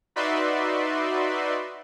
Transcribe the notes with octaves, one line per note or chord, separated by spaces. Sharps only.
D#4 F#4 B4 D5 E5 C6